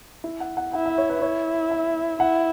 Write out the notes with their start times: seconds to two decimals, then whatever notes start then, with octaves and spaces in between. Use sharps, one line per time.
0.24 E4
0.40 F#5
0.57 F#5
0.73 E4 F#5
0.86 E5
0.98 C#5
1.09 B4
1.22 E4 C#5
1.71 E5
2.20 E4 F#5